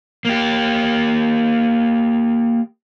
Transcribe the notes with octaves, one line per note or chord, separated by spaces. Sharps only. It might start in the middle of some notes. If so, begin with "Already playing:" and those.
A#3 G4